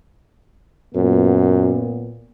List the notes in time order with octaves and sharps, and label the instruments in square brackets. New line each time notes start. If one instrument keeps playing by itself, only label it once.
[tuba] F#2 [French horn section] A#2 B3